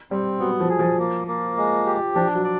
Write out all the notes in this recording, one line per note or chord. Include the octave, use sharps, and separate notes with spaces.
G3 C4
F#3 B3
F3
G#4
F3
A#3
A#3
G#3
G4
F3 D4
F#3
D5